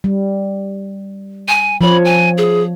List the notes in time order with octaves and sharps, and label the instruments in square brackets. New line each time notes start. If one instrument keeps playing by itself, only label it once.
[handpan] G3
[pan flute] G#5
[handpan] F3 C#5 [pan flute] B5
[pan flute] G#5
G#4